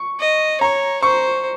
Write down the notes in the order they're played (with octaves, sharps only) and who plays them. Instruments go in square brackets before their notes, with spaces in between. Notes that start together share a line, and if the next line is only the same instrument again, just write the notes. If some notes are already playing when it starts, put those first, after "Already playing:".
Already playing: [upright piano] C#6
[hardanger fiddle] D#5
[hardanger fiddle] C#5 [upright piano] A#5
[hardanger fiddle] C5 [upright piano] C#6